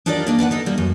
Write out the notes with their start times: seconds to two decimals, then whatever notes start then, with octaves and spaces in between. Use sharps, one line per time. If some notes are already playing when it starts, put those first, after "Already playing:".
0.06 D4 D#4 F4 G4 A#4 D5
0.27 A#3 D4 D#4
0.39 D4 B4 E5 F#5
0.51 D#4 A4 A#4
0.66 G3 A#3
0.78 F#2